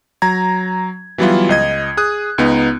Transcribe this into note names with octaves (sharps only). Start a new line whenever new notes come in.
F#3 A#5 G#6
E3 F#3 G3 B3 E4 F4
C#2 D#5 G#6
G#4 D#6 F#6
C#2 B3 D#4